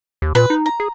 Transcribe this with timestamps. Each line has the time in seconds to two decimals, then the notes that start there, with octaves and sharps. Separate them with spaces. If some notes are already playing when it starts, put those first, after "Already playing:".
0.22 D#2
0.35 A#2 B4
0.50 D#4
0.66 A#5
0.80 G#4